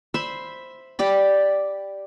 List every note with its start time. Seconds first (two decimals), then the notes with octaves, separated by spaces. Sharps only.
0.14 C5 E5 B5 C6
0.99 G4 D5 B5